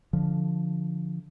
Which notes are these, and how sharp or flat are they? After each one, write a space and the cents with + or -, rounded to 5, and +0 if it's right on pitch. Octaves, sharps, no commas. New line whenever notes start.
D3 +0 F3 +0